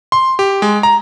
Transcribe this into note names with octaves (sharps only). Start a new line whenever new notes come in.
C6
G4
G#3
A#5